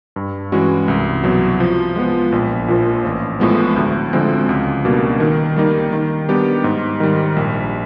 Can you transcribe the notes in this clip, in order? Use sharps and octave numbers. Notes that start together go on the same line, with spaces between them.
G2
E3 G#3 C#4 F#4
C2
B2 F#3
F3
G#3 B3
A#1
A#2 F3
A1
A2 F3 G#3 B3
D2
D3 F3 G#3 C4
C#2
B2 G3 A#3 D4
D#3
G3 A#3 D#4
D#3
G3 B3 D4 G4
G#2
D#3 G3
A#1